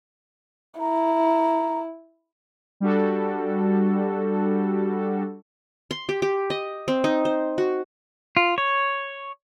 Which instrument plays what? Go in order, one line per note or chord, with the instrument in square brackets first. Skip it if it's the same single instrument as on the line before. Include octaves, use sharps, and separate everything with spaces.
[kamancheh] E4 [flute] A#5
[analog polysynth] G3 D4 F#4 A4
[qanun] C6
G4
G4
D#5
C4
D#4
C5
F#4
[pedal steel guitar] F4
C#5